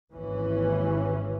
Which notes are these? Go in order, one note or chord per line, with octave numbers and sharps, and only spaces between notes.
G#1 D#2 E3 C#4